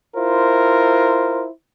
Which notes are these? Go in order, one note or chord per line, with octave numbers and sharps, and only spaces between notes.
E4 F4 A#4 C5